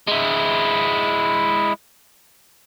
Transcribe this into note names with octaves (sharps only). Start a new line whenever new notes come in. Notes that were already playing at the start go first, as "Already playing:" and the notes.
G#3 E4